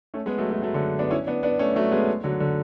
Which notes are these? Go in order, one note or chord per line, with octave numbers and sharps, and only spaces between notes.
A3 C#4
G#3 B3
F#3 A3
F#3 A3
F#3 A3
D3 F#3
B3 D4
C#4 E4
B3 D4
B3 D4
A3 C#4
F#3 A3
G#3 B3
D3 F#3
D3